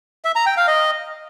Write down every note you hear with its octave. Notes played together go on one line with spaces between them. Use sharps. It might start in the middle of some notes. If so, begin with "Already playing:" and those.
E5
A#5
G5
F5
D#5